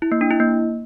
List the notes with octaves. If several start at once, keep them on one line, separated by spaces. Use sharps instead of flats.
E4
A#3
D4
E4
A#3